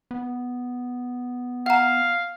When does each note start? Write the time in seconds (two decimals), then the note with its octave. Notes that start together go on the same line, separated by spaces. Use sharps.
0.11 B3
1.66 F5 F#5 A#5